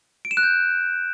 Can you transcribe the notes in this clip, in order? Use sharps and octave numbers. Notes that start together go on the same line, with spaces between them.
D7
E7
F#6
G6